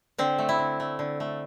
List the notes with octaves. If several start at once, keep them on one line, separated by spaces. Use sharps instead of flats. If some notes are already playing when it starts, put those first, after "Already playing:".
D3 C4
A3
E4
D3
A3
D3
A3